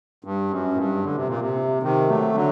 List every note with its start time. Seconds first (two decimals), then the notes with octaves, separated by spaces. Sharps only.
0.24 G2
0.51 F#2
0.73 A2
0.77 G2
1.04 D3
1.15 C3
1.28 A#2
1.41 C3
1.83 C3 D#3
2.08 F#3 A3
2.35 D3 F#3